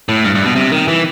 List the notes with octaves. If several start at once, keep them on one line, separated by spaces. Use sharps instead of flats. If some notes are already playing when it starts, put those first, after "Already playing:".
A2
G2
G2
B2
C3
D#3
E3